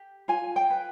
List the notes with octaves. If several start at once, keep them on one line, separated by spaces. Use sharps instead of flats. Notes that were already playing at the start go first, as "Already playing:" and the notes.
Already playing: G4
F4 G#5
G5
B4